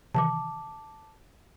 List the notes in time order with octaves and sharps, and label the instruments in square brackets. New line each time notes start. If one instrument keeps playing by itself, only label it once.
[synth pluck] C3 D#3 E3 [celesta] A5 D6